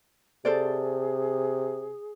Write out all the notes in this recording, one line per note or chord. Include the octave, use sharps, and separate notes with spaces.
C3 G#4 A4 C5 D5